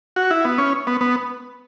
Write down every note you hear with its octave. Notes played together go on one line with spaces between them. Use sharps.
F#4
E4
B3
C#4
B3
B3